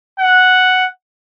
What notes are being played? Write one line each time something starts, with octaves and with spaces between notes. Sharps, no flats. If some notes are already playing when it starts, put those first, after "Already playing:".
F#5